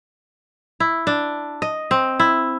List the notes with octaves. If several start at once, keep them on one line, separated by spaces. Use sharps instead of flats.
E4
D4
D#5
C4
E4